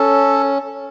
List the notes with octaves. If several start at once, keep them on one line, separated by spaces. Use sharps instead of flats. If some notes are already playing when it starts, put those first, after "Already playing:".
Already playing: C#4 A4